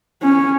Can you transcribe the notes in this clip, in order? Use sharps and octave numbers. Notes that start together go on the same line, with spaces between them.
C#4